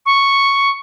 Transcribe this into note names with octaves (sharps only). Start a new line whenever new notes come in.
C#6